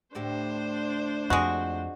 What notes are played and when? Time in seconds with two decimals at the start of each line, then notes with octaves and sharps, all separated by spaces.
0.15 D2 A2 D4 G4 C5
1.30 F2 G#3 F#4